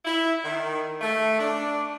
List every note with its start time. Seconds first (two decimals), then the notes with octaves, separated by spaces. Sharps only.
0.05 E4
0.44 D#3
1.01 A3
1.39 D4